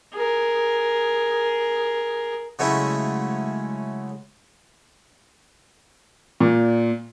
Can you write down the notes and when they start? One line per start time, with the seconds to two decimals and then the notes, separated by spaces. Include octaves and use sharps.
0.14 G#4 A#4
2.59 C#3 F#3 G#3 A3 C#4 E4
6.40 A#2